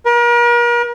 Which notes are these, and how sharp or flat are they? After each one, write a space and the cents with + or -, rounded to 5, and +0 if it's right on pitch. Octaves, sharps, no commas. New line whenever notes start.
A#4 +40